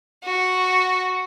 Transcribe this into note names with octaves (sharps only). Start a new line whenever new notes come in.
F#4